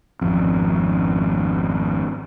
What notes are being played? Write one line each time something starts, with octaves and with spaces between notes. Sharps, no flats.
G#1 F2